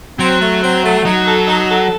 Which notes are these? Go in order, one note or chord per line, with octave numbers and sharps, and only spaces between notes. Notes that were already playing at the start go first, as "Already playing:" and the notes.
F#3 C4
A3
C4
A3
F#3 D#4
A4
D#4
A4